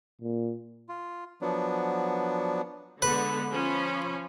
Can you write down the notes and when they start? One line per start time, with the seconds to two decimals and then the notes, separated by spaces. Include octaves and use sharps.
0.21 A#2
0.89 F4
1.42 F3 F#3 B3 D4
3.02 D3 G#3 B3 B4
3.50 F3 C#4 B5